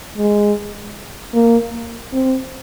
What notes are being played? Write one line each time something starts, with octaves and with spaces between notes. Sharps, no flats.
G#3
A#3
C4